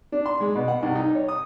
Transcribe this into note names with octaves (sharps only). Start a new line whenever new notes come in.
D4
C6
G#3
B2
F#5
C2
D#4
C#5
D#6